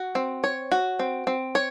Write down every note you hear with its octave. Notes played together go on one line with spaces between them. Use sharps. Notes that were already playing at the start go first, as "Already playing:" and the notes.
Already playing: F#4
C4
C#5
F#4
C4
C4
C#5